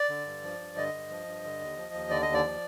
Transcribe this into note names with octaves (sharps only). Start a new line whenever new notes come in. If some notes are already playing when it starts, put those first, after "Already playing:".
Already playing: D5
D3
G2
F3
G2
D3 D#5
G2
F3
G2
D3
D#2
F3
D#2
D3 D5
D#5
D#2
D5
F3